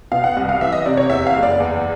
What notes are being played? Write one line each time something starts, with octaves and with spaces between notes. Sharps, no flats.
B2 F5
F#5
C2
F5
E3 E5
D#5
C3 D5
C#5
E2 E5
F5
F#1
D5
E2